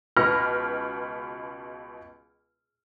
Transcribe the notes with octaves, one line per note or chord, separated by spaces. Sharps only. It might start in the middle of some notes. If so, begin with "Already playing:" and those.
C#2 B2 B4 F6 A#6 C#7